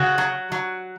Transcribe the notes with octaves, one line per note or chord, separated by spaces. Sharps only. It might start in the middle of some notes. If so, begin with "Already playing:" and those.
Already playing: C#3 F#4
F#3
F#3